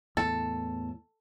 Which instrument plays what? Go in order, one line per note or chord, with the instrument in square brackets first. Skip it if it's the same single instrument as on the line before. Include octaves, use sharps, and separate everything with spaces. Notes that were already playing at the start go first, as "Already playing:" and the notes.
[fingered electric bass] E2 A2 [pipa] A4